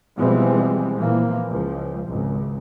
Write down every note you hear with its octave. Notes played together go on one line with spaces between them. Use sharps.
B2 E3 F3 G3 G#3 C4
A#2 E3 F3 A#3
C#2 F3
G#1 C#2